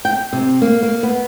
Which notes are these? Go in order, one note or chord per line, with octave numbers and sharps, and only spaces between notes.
G5
C3
A#3
A#3
B3